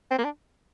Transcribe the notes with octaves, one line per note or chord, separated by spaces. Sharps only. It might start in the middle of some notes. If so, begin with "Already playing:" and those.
C4
A#3
D4